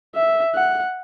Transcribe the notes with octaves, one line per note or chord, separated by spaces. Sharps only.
E5
F#5